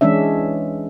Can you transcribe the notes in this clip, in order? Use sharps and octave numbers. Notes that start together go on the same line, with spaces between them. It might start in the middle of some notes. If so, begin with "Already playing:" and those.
E3 G#3 C#4 D4 E5